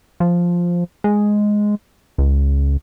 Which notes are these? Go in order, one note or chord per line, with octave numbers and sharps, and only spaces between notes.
F3
G#3
C#2